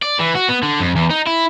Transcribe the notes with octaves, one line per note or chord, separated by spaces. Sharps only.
D5
E3
F#4
B3
D3
F2
E2
D#4
E4